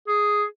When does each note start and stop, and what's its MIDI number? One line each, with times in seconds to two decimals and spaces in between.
0.08 0.44 68